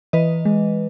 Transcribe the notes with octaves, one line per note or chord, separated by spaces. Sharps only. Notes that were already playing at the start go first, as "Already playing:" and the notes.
E3 B4 D#5
G#3